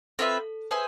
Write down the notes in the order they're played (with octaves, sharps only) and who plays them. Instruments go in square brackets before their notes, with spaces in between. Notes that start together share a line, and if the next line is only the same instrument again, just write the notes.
[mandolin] C4 F4 B4 E5 [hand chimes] A4
[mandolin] G#4 C5 E5 G#5 [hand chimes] B4